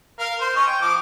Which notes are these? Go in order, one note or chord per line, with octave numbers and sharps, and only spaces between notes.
A#4 F5
C5 C6
C#4 C#5 D#5
G5
F3 D6